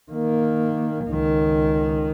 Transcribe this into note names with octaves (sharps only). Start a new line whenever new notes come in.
D#3 A#3
C#2 D#3